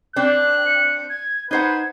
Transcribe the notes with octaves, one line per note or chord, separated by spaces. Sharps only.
C4 D4 F#6
C#7
G#6
D#4 B4 C5 F#5 G#6